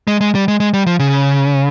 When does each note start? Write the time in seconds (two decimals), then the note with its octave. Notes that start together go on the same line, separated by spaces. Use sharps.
0.07 G#3
0.21 G#3
0.35 G3
0.48 G#3
0.60 G#3
0.74 G3
0.86 F3
0.99 C#3